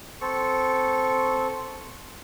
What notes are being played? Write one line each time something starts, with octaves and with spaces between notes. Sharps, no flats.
C4 A4 C#6